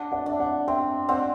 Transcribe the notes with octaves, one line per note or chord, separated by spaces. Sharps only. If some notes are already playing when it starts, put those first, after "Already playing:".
Already playing: D4 D5 F#5
D5 F#5
D4 E5
D5 F#5
C4 E5 G5
C4 D5 F#5